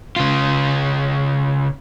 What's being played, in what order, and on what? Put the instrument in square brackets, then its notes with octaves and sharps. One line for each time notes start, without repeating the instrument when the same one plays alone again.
[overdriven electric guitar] C#3 F4